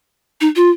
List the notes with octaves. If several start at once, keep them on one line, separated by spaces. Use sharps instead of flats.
D#4
F4